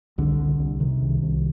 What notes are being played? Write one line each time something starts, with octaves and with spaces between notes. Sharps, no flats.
C2 D3
C2
C2
C3 D#3
C2
C2